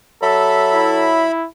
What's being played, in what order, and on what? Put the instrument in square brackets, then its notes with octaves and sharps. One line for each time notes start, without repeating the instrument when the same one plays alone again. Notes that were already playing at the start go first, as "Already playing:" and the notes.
[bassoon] F#3 [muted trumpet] A4 [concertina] E5 B5
[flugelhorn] E4